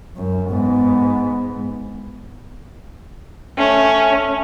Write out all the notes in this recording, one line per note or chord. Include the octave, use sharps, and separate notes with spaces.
F#2
G#2 B3
A3 C#4